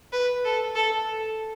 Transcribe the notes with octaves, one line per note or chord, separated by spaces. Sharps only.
B4
A4
A4